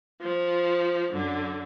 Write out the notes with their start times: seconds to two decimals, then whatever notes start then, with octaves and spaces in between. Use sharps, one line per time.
0.20 F3
1.10 F#2 D3